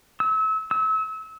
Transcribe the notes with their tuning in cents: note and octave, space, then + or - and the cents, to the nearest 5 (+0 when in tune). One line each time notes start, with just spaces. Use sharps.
E6 -30
E6 -35